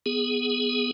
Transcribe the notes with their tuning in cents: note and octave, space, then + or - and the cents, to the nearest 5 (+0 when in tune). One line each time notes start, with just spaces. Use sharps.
B3 +0 G#4 +0